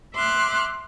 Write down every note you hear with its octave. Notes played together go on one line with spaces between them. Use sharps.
E5 C6 D6 F6 F#6